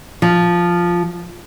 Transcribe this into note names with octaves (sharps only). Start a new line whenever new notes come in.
F3